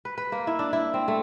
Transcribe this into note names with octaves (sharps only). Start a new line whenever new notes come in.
B4
B4
A#3
E4
D4
E4
C4
A3